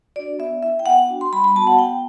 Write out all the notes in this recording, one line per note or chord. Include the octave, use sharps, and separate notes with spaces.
D4 F#4 D5
B3 E5
E4 E5
G5
B3 F#5
D4 F#4
C6
G3 B5
B5
B3 F#4 A5
F#5
B3 G5